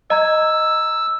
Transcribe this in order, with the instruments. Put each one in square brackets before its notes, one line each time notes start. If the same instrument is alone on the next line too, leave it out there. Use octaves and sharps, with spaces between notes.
[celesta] D#5 A#5 G#6 [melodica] E6